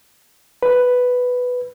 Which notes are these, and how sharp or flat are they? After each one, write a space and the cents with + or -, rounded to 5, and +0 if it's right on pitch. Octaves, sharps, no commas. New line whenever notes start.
B4 +5